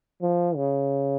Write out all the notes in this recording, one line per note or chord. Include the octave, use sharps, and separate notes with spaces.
F3
C#3